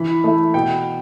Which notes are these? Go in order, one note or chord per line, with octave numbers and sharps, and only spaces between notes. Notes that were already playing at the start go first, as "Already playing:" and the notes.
Already playing: E3 B5
A3 E4
B2 G5